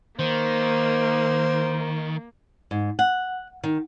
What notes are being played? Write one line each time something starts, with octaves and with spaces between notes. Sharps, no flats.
D#3 A#3 C5
G#2
F#5
D#3